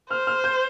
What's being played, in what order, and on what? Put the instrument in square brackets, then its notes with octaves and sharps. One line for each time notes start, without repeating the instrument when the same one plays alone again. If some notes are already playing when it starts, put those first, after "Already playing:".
[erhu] C5 [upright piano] F6
[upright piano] F6
G6